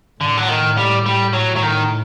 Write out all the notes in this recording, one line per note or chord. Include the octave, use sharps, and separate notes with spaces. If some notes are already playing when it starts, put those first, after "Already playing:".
A2 D3
F#3
D#3
G3
G3
A2 F#3
F#3
D#3